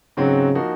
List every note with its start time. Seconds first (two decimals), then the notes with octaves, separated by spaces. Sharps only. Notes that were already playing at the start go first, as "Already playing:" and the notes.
0.17 G#2 C#3 F#3 C4 F#4
0.55 F3 A#3 D#4 F#4